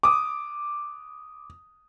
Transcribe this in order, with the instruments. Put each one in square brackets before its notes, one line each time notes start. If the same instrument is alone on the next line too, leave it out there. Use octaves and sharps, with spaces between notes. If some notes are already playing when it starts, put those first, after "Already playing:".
[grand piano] D6 D#6